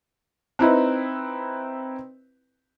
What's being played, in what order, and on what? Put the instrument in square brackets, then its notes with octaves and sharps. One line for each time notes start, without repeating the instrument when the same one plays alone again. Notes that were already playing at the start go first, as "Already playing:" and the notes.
[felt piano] C4 D#4 E4 B4